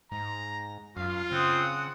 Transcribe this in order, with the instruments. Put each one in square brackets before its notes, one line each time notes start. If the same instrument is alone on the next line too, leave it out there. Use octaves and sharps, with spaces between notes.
[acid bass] G#2 [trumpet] A#5
[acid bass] F#2 [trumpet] F4 [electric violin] F5
[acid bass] C#3 [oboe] C4 [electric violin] F#5 D#6